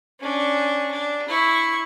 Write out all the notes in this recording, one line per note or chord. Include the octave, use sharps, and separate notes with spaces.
C#4 D4
D4
E4 C#6